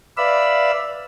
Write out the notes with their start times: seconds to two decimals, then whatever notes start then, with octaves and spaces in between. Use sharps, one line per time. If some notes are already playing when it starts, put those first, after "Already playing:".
0.17 B4 D5 E5 F5 B5 E6